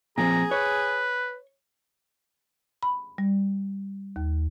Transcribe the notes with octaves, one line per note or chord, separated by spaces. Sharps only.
A#2 F3 C4 G#4 A#5
B4 C#5
B5
G3
D#2